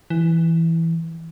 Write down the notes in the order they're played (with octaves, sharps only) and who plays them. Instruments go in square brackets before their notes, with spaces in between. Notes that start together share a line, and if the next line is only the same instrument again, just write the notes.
[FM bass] E3